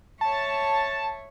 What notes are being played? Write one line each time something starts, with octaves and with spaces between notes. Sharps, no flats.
C#5 E5 A5